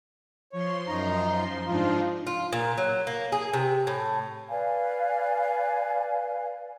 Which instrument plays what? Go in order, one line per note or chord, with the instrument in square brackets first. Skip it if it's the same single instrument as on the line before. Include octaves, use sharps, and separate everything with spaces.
[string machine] F3 C6 [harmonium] C#5
[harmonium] F#2 D#4 A#5
[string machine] G#2 D4 D#4 [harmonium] F3 F4
[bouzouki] F4
A#2
F#3
A#3
G#4
C3
A2
[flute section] B4 D5 F5 G#5